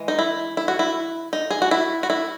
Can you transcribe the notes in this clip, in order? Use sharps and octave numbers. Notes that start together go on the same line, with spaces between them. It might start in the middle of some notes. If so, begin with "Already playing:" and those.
Already playing: E3 G#3
D#4
E4
E4
F#4
E4
D#4
G#4
F#4
E4
F#4
E4